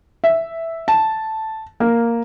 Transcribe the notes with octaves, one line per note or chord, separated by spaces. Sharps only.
E5
A5
A#3